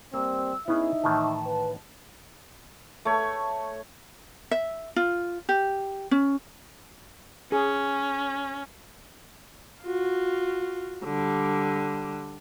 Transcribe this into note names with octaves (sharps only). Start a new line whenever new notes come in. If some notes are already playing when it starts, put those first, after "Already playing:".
G3 A#3 C4 E6
B3 C#4 D#4 E4 G#4 E5
A2 D#3 E3 A5
B4
A3 C#5
E5
F4
G4
C#4
C#4 G#4
F4 F#4
D3 G3